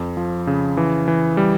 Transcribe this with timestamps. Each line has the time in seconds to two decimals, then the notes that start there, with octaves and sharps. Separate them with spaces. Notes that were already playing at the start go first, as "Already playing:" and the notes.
Already playing: F2
0.17 F3
0.47 C#3
0.77 E3
1.08 E3
1.37 G3